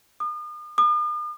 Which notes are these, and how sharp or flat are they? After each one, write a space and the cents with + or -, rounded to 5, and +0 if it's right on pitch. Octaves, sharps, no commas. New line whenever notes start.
D#6 -40
D#6 -45